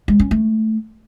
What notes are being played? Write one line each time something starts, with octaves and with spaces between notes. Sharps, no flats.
G#3
C#4
A3